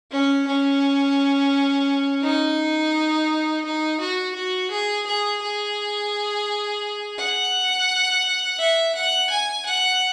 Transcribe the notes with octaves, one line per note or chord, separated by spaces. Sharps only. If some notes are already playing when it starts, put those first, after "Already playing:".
C#4
C#4
D#4
D#4
F#4
F#4
G#4
G#4
G#4
F#5
E5
F#5
G#5
F#5